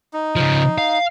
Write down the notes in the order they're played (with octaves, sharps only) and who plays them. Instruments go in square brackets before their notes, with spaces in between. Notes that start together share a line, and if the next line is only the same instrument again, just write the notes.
[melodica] D#4
[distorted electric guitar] C#3 F3
F5